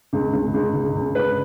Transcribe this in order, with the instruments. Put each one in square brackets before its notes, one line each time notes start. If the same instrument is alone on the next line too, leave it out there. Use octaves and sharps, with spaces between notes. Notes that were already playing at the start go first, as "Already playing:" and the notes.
[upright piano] C#2
C#2
C#2
C#2
C#2
C#2 B4